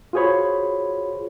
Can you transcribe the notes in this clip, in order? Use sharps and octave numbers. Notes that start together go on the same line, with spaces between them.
F4 F#4 G#4 C5 C#5 B5